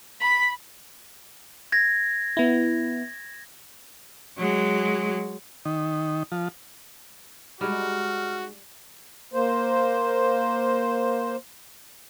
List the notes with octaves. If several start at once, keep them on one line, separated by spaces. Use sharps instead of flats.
B5
G#6 A#6
B3 E4
F#3 G#3
D#3
F3
G3 G#3 D#4 F#4 F6
A#3 C5